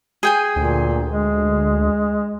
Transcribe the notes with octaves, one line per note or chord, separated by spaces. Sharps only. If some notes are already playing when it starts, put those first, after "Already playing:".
G#4 G5 G#5
D2 A#2
G#3